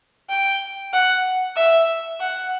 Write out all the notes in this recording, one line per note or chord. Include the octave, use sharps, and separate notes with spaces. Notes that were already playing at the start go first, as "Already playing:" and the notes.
G5
F#5
E5
F#5